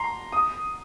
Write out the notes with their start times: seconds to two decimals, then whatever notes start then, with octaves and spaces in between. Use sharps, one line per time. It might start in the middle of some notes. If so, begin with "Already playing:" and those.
Already playing: A#5 C6
0.32 D#6